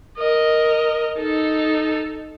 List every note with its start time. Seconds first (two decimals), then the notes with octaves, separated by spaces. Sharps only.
0.18 A#4 D#5
1.19 D#4 A4